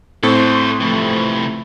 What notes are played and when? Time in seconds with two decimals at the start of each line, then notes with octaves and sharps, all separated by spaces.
0.23 A2 C4 A4 C5 C#6
0.81 C3 E3 F3 A3